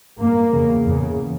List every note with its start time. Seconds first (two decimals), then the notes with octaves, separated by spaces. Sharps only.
0.19 G2 A#3
0.52 E2 C#3
0.84 E2 C#3